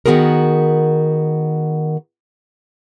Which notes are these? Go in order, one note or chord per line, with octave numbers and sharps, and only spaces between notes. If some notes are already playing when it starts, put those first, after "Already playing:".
D#3 B3 F#4 G#4 A#4